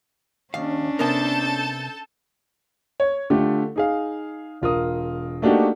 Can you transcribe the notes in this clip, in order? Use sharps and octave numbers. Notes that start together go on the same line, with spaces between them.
D#2 C#4 D4 F5
C3 B3 A4 A#4 A5 G6
C#5
D3 A3 F4 G4
D#4 G#4 F5
E1 F4 A#4 D#6
A3 A#3 D4 D#4 F#4 G4